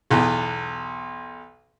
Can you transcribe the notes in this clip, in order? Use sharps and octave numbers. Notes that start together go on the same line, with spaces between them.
B1 E2